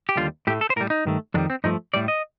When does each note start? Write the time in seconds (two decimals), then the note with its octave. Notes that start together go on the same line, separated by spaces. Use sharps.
0.09 G4
0.17 D#2 D3 G3 F4
0.47 A2 G4
0.50 A3
0.61 A4
0.70 C5
0.76 A2 A#4
0.81 G3
0.90 D#4
1.05 G2 D#3 A3
1.34 F2 D#3 G3 D4
1.50 C4
1.64 G2 F3 A3 D#4
1.94 A2 G3 D5
2.08 D#5